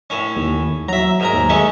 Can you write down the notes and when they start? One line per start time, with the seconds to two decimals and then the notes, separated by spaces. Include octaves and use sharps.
0.10 A2 C#4
0.36 D#2
0.88 F#3 E5 A#5
1.20 G#2 A#4 A#5
1.33 D#2
1.49 G#3 A3 C#4